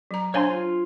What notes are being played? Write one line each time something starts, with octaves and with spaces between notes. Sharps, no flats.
F#3 A#5
D4 C5 C#5 F5 G#5 C6
F4